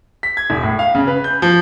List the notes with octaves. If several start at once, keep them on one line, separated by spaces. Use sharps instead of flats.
B6
G#6
E1
A2
F5
C#3
B4
G6
F3